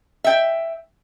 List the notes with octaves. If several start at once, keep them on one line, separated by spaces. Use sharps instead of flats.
E5 G5